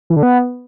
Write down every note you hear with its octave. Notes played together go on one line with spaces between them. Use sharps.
E3
D3
B3